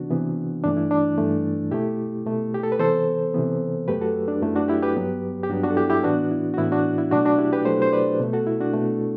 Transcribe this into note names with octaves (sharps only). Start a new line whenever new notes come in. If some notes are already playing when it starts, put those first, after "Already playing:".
Already playing: C3 E3 B3 D4 F#4
C3 E3 B3
G2 E3 A3 D4
E4
D4
G2 E3 A3
B2 A3 E4 G4
B2 A3
G4
A4
B4
C3 E3 B3 A4 C5
C3 E3 B3
F#2 F#3 A3 G4 B4
F#4 A4
D4
F#2 F#3 A3 E4
D4 F#4
E4 G4
G4 B4
G2 F#3 B3
G4
G2 F#3 B3 D4 F#4
D4 F#4
A4
E4 G4
E4 G4
A2 E3 B3 D4 F#4
E4
F#4
A2 E3 B3 E4
D4 F#4
E4
B2 F#3 A3 D4 F#4
D4 F#4
E4 G4
G4 B4
B2 F#3 A3 A4 C5
C5
B4 D5
B2 A3
F#4 A4
E4
D4 F#4
B2 A3